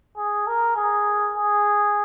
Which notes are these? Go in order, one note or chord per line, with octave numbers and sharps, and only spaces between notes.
G#4
A#4
G#4
G#4